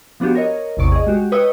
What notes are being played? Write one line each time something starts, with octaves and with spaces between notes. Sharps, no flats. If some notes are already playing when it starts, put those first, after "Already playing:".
F3 B3 D4 F#4 G4
A#4 C#5 D#5
A1 E2 C3 D5 C#6 D#6
G#4 D#5
G#3 F#4 G4
B4 C#5 D#5 G5 D#6 E6